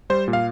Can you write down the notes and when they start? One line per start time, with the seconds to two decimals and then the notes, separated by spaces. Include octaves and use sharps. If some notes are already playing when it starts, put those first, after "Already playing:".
0.10 G3 C5
0.28 A#2
0.33 F5